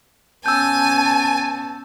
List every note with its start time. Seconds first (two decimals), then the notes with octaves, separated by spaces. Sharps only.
0.46 B3 C#4 G#5 A5 E6 G6